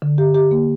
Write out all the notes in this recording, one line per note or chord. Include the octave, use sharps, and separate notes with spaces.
D3
G4
G4
A#3